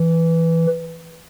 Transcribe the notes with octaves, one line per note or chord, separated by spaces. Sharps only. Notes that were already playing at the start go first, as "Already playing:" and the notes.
Already playing: E3